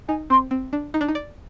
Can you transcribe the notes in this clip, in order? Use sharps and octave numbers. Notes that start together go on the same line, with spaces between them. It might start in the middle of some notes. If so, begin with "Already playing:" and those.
D#4 G#5
C4 C6
C4
D4
D#4
D4
D#4
D5